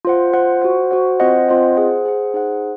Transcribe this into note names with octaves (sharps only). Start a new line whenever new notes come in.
F4 C5 F#5
F4 C5 F#5
F#4 C5 F#5
F#4 C5 F#5
C4 F4 C5 D#5 F#5
C4 F4 C5 D#5 F#5
G#4 C5 F#5
G#4 C5 F#5
D#4 G#4 C5 F#5